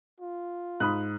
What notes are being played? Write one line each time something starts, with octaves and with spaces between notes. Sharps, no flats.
F4
G#2 B5 D#6 F#6